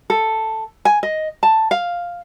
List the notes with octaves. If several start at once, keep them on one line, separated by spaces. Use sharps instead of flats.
A4
G#5
D#5
A5
F5